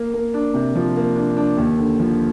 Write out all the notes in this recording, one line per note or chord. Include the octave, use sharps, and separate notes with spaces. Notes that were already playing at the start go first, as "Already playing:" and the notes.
Already playing: A#3
A#3
D4
C3
F3
A#3
D4
D4
D#2
D3
F3